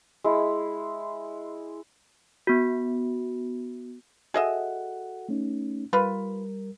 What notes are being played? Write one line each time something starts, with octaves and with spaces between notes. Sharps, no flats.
G#3 E4
B3 F#4
F#4 G#4 A4 D#5 E5 F#5
A3 C#4 D#4
G3 F4 A#4 B4